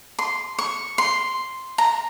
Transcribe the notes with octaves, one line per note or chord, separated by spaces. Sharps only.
C6
C#6
C6
A#5